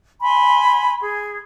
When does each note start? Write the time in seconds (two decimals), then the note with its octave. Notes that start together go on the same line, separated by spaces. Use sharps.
0.21 G#5 B5 C6
1.01 G#4